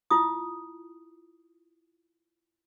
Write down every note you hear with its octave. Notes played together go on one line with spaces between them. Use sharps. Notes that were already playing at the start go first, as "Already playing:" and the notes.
E4 F4 D#6